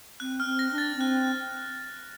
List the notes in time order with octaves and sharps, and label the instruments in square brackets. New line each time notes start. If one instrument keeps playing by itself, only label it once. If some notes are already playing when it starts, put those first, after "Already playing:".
[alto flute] C4 [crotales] F#6
[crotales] F6
[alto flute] C4
[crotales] A#6
[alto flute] D4
[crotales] A6
[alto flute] C4 [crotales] F#6